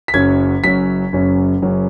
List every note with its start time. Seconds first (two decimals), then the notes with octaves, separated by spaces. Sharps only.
0.08 B6
0.14 F#1 F#2 F#3 C#4 G#6
0.63 F#1 F#2 F#3 C#4 B6
1.13 F#1 F#2 F#3 C#4
1.62 F#1 F#2 F#3 C#4